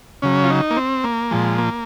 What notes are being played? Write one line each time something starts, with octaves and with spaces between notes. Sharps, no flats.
C#3 F#3 C#4
F4
D#4
A#3
C4
A#3
A#2 F3 G#3
A#3